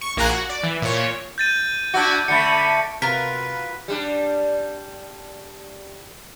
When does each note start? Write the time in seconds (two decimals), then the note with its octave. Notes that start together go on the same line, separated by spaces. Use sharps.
0.01 C#6
0.17 A#1 A#3 G#5 A#5 F#6
0.30 F#4
0.49 D5
0.63 E3
0.82 A#2 C#5
1.38 G6 A6 D#7
1.94 D4 E4 F#4
2.28 D3 A3 B5 C#7
3.02 C3 F4 F#4 A#4 B4 A#5 B5 B6
3.88 G3 D4